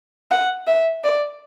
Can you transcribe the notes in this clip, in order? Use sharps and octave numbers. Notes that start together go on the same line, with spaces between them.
F#5
E5
D5